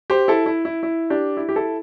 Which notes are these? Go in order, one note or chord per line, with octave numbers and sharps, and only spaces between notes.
G4 C5
E4 A4
E4
E4
E4
D4 G4
E4
G4
E4 A4